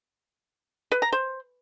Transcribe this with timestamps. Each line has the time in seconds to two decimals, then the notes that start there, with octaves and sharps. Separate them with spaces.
0.92 B4
1.02 A#5
1.12 C5